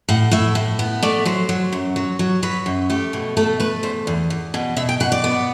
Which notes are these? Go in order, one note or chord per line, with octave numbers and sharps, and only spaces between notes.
A2 F#5
A2 E5
A2
B3
A3 D5
F#3 C5
F#3
F#2
F#3
F#3
F#3 B4
F#2
A3 G4
B2
A3 A4
A3 B4
E2 C5
E2
E2
B2
B2 E5
G5
B2 F#5
D5
B3